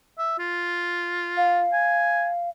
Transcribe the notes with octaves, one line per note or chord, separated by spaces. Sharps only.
E5
F4
F5
G#5